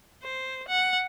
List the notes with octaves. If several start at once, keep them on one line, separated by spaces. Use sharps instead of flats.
C5
F#5